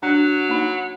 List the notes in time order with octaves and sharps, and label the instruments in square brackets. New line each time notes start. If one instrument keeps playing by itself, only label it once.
[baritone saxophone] F#3 [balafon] D4
[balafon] A#3 D#4